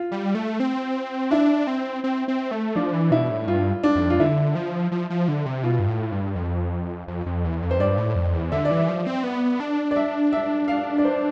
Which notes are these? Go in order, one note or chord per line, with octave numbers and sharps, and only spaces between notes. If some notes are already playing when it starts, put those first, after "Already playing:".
Already playing: F4
G3
A3
C4
D4 E4
C4
C4
C4
A3
F3 D4
E3
B2 E4
A2
G2 F4
D4
F2
F4
D3 E4
F3
F3
F3
D3
C3
B2 F4
G2
A2
G2
F2
F2
F2
E2
F2
C5
G2 D5
A2
F2
E2
D3 E5
D5
E3
E5
F3
C4
B3
D4
D5
E5
E5
F5
D5
C5